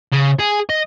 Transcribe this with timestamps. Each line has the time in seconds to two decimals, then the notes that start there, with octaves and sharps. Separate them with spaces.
0.12 C#3
0.39 G#4
0.70 D#5